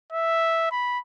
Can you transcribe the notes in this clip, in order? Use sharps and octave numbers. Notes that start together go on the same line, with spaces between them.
E5
B5